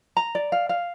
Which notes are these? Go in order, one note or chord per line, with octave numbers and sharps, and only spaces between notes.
A#5
D5
F5
F5